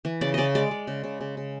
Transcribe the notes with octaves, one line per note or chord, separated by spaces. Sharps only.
E3
C#3 D5
C#3 D5 D#5
G#3 D5
G#3
C#3
C#3
C#3
C#3